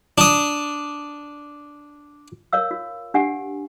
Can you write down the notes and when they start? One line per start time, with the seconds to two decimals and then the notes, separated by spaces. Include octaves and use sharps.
0.18 D4 D#6
2.53 A#4 C#5 F5 E6
2.71 F4
3.14 D4 G4 F#5 G#5